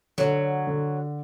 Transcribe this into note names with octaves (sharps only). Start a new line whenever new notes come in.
D3 F#3
D3